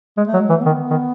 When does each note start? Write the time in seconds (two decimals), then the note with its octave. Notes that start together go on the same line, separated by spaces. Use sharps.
0.17 G#3
0.27 A3
0.34 F#3
0.38 G#3
0.50 E3 A3
0.61 B3
0.66 D#3
0.71 B3
0.91 D#3